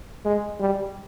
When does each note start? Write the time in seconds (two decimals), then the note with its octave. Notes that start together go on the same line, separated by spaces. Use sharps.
0.25 G#3
0.60 G3